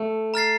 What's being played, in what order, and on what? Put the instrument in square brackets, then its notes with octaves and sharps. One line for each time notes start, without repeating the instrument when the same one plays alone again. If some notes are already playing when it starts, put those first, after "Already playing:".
Already playing: [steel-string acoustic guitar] A3
[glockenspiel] A#5 F6 A6 C7